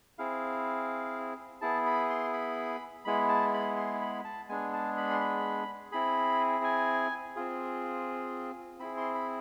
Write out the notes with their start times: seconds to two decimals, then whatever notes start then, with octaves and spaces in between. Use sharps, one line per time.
0.18 C4 E4 G#4 F5
1.61 B3 E4 G#4 A5
1.86 B5
2.10 C6
2.33 B5
3.05 G#3 B3 E4 G#4 B5
3.29 A5
3.54 B5
3.77 C6
4.01 B5
4.24 A5
4.49 G#3 B3 D4 G#4 G#5
4.73 A5
4.97 B5
5.10 C6
5.21 B5
5.92 C4 E4 G#4 B5
6.64 G#5
7.36 C4 F4 G#4
8.79 C4 E4 G#4 B5
8.97 C6
9.15 B5